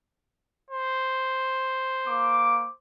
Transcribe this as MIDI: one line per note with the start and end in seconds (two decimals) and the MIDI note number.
0.70 2.75 72
2.07 2.67 58
2.07 2.67 86